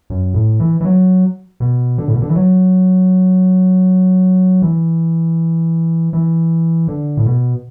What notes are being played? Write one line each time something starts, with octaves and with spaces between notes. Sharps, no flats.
F#2
A2
E3
E3
F#3
B2
D3
A2
B2
D3
E3
F#3
E3
E3
D3
A2
B2